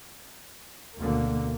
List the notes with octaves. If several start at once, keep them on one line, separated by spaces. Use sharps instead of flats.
D2 B2 D3 A#3